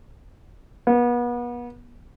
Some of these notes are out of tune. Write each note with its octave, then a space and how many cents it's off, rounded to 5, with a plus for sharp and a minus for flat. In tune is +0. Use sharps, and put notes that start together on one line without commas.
B3 -35